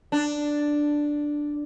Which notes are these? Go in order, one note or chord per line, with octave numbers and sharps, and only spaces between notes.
D4